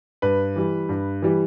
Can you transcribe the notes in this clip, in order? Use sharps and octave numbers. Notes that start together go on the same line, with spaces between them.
G2 B4
E3 G3
G2
E3 G3